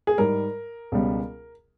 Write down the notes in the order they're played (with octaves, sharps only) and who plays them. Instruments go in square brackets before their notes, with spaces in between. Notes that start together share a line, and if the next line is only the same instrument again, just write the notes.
[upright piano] G#4
G#2 G3 A#4
C#2 B2 G3